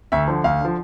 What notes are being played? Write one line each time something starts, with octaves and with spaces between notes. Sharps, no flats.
D2 E5
D3 F3
D2 F5
D3 F3